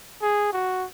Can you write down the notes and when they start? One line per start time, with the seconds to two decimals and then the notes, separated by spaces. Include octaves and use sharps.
0.22 G#4
0.53 F#4